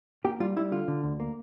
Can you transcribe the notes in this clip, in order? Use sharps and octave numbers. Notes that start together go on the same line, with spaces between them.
A#3 G4
G3 F4
G3 E4
D3 F4
D3
D2
A#3